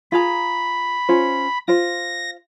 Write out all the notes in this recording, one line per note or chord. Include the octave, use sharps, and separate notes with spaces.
F4 G#4 A#5 B5
C#4 F4 C5
F4 C5 A#6